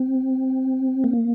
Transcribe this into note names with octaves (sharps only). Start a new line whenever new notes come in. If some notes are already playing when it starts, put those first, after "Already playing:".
Already playing: C4
A#3